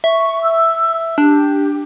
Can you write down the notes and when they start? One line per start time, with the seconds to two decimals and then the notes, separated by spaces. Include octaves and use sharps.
0.04 E5 C#6
0.42 E6
1.18 D4 G4